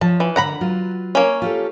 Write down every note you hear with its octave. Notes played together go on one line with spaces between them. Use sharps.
F3 C#5 A5
E3
D3 A#4 F#5 A#5 B5
F#3 F4 B4
A#3 C#4
F4 G4 A4